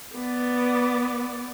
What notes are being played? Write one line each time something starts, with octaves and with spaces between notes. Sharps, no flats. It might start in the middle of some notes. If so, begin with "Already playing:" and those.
B3 D5